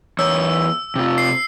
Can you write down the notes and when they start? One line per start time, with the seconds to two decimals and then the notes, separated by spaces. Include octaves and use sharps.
0.19 E2 C#5 E6
0.96 C3 F4
1.18 C7